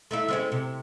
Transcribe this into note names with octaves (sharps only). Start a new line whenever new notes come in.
A3 D#4 E4
G#3 C4 C#4
C3